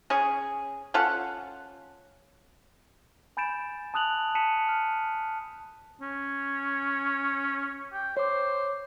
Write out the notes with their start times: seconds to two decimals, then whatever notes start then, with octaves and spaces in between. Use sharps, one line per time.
0.10 C#4 G#4
0.94 C#4 F4 A4 F#5
3.37 G#5 B5 G6 A6 D7 E7
3.94 A5 D#6 F#6 F7 F#7
4.35 A5 B6 C#7 D#7 E7
4.69 F6
6.01 C#4
7.93 G5
8.17 C5 C#5 D6